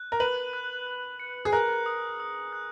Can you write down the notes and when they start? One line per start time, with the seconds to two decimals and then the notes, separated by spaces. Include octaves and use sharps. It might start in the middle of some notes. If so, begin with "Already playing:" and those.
Already playing: F#6
0.12 A#4
0.20 B4 F#7
0.53 F#6
0.87 F#6
1.20 C#7
1.45 G#4
1.52 A#4 F#6
1.86 D#6
2.20 D#6
2.53 F#6